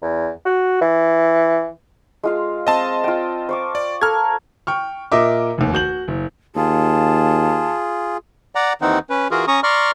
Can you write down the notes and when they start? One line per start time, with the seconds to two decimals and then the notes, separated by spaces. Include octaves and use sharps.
0.02 E2
0.45 F#4
0.81 E3
2.23 G#3 F4 F5
2.67 C4 D#5 A5 C6
3.04 F4 G5
3.49 C5 C#6 D6
3.75 D5
4.02 A4 A#4 F6 G#6
4.67 G5 C#6 F6
5.12 A#2 A#4 D#5 E5 D6
5.58 F1 D#2
5.73 F#4 G6 F#7
6.08 F#1
6.56 D#2 F4 G#4 A5
8.55 D5 F#5 A#5
8.82 D#2 D#3 E3 C4 D#4 F#5
9.10 C#4 B4
9.31 E3 F4 F#4 G#4 A#4
9.48 C#4 A#5 C#6 D#6
9.63 D5 A#5 C6 C#6 F6